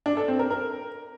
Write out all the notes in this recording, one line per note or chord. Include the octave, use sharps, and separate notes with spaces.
D4
A4
C4
A#4
A#4